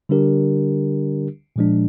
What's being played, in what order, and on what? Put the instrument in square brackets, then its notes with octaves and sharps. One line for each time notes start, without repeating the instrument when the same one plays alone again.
[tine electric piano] D3 G3 D4 G4 A#4
A#2 F3 G#3 D4